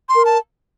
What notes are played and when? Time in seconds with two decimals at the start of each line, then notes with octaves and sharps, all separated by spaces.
0.09 C6
0.15 A#4
0.25 A5